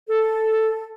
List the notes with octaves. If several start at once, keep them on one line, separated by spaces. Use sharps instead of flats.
A4